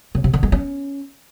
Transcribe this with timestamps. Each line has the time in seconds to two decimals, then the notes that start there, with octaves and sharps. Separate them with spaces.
0.15 C#3
0.24 C3
0.33 D3
0.43 G#3
0.52 C#4